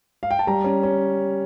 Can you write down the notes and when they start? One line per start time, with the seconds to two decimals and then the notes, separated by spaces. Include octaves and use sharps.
0.23 F5
0.31 G5
0.39 A5
0.47 G3 A#5
0.64 C#4
0.83 C#4